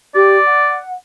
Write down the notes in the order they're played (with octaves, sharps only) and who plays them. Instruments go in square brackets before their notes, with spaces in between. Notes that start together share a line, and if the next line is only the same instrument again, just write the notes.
[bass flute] G4 [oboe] D5
[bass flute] F#5